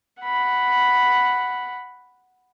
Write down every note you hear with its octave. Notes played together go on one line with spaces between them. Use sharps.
F#5 B5